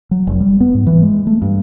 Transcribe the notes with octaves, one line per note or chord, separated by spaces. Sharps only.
F#3
F1
G3
B3
G#2
E3
G#3
A3
G2